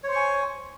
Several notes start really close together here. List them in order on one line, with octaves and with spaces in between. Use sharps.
C#5 C5 C#6 G#5